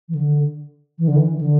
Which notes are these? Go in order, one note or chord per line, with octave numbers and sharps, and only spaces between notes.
E3
D3
E3
D3
E3
E3
D3